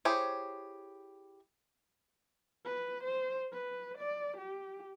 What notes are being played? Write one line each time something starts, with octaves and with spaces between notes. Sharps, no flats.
E4 G4 G#4 C5 C#5
B4
C5
B4
D5
G4